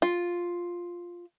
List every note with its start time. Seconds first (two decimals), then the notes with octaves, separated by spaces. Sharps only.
0.02 F4